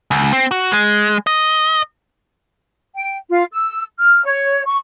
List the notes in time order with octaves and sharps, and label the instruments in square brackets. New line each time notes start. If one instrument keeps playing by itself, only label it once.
[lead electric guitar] C#2
C4
F#4
G#3
D#5
[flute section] G5
F4
E6
F6
C#5
C#6